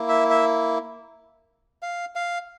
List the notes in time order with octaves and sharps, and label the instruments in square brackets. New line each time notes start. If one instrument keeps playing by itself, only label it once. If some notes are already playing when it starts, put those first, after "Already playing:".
Already playing: [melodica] A#3 E4
E5
E5
F5
F5